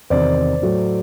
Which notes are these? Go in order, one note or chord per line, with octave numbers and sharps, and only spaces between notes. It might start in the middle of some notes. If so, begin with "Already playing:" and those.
E2 C3 D#3 C5 D5
A2 F#3 A3